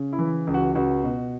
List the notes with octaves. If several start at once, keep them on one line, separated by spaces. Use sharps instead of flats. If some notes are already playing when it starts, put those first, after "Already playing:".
Already playing: C#3
E4
E3
C#2
F#4
C#2 F#4
B2